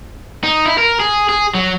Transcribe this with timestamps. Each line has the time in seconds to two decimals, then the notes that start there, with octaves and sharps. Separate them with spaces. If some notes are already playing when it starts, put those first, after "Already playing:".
0.44 D#4
0.66 E4
0.78 A#4
1.00 G#4
1.29 G#4
1.55 F#3